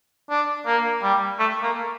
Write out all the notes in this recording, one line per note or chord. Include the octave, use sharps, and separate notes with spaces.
D4
A#3
G3
A3
A#3